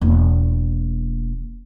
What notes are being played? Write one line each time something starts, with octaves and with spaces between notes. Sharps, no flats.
E1 A#3